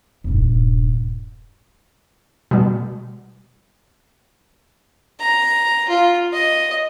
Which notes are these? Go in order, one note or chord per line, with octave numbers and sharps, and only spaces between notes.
D#1 G2
B2 G3
A#5
F4
D#5